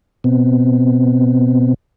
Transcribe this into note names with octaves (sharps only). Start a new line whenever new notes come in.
B2 B3 C4